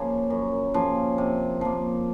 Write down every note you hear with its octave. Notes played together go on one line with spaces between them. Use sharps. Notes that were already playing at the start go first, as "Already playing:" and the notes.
Already playing: C#3 F3 A#3
F#2
C#3 F3 A#3
C3
F3 A#3